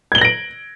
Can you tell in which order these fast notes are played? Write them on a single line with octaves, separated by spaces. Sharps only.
G#6 G7 F#7 A#6 D7